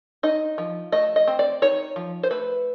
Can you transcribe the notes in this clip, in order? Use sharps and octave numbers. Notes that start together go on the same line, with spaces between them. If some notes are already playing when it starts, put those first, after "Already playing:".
D#4 D#5
F3
A3 D#5
D#5
C4
D5
D#4 C#5
F3
C5
A3 B4